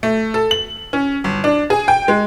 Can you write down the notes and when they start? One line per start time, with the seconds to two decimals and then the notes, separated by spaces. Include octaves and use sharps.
0.03 A3
0.34 A4
0.51 F#7
0.93 C#4
1.24 G1
1.44 D4
1.70 G#4
1.88 G5
2.08 G#3